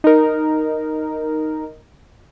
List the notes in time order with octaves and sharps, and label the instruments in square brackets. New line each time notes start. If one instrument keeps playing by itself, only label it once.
[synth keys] D#4 A#4